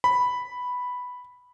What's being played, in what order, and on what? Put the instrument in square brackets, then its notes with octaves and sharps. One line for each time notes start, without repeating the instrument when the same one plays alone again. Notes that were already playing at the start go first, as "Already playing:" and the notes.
[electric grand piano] B5